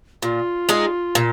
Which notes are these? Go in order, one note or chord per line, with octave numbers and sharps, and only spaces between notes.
A#2 F4
G#3 D#4 G#4
A#2